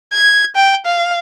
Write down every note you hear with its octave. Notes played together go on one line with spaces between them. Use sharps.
G#6
G5
F5